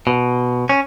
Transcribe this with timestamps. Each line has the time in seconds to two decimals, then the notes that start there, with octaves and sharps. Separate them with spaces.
0.07 B2
0.69 C#4